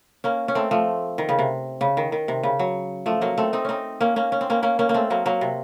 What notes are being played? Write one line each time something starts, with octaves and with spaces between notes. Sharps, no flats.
A#3 C#4
C#4
A3 C4
F3 A3
D#3
C#3
C3
C#3
D#3
D#3
C3
C#3
F#3
F3 A3
F#3 A#3
A3 C4
C4 D#4
C4 C#4 D#4
A#3 C#4
A#3 C#4
C#4
C4
A#3 C#4
A#3 C#4
A#3 C#4
A#3
A3 C4
F#3 A#3
F#3 A#3
C3